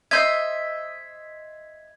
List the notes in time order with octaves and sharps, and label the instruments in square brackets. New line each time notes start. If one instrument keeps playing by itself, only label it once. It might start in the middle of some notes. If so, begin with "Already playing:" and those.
[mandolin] C5 D#5 E5 [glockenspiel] G#6